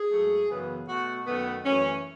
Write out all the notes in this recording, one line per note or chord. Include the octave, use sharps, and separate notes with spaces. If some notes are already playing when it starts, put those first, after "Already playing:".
Already playing: G#4
G#2 F#3 A3
F#2 C#3 E3 B3
B2 A3 F#4
F#2 D#3 A3 B3
F#2 E3 A3 C#4